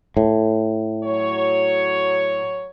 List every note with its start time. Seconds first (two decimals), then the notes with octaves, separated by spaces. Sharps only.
0.17 A2
1.04 F#3 C#5